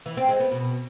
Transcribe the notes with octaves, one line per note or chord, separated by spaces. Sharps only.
E3
C4
G#3
B3
B2